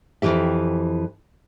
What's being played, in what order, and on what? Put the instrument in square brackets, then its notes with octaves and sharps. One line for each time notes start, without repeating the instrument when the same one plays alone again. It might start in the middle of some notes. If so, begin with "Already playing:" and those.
[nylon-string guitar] F2 C#3 E3 G4 E5